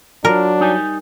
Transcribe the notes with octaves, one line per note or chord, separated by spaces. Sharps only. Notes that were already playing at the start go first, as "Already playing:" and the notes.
F#3 D4 F4 A#4
G3 D#4 G#5